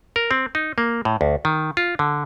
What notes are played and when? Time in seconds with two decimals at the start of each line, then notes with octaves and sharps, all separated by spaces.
0.16 A#4
0.31 C4
0.55 D#4
0.78 A#3
1.05 A2
1.21 D2
1.45 D#3
1.77 F4
1.99 D3